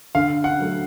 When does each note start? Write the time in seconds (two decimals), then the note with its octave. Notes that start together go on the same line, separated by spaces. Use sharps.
0.15 D3 F5
0.44 F#5
0.59 F#3 A3